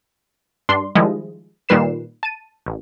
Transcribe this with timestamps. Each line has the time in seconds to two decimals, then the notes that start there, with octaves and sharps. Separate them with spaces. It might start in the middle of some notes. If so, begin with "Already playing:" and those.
0.69 G2 D4 C6
0.95 D#3 F3 G3 G#3 E4 D#5
1.69 A#2 D#3 G3 B4 C7 E7
2.23 A5 D#7
2.66 A1